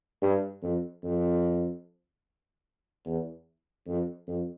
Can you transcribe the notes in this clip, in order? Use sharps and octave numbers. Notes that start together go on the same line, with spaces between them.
G2
F2
F2
E2
F2
F2